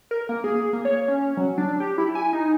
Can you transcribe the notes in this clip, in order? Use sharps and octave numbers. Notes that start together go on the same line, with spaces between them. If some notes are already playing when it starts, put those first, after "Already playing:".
A#4
A#3
G#4
A#3
C#5
C#4
F#3
D4
G4
E4
G#5
D#4